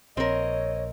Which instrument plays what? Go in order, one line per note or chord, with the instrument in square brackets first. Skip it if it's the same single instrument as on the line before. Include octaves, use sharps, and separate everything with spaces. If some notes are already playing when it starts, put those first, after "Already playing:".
[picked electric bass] A#1 [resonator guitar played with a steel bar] C4 A#4 [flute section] C#5 [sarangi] D#5